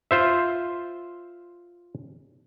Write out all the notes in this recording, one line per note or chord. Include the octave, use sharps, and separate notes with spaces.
F4 C5 E5